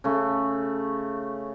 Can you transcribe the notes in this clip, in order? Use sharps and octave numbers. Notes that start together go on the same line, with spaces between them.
C#3 A3